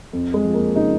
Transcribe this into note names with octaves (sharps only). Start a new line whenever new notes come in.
F2
G#3
F3
A#3
C#3 D#4